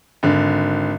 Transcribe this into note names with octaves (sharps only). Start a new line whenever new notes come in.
G#1 D3